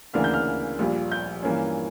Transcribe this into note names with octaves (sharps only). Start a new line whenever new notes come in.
D2 C#3 E3 A#3 D4 F6
G6
F6
A#1 A#2 G3
G6
G2 E3 A#3 C#4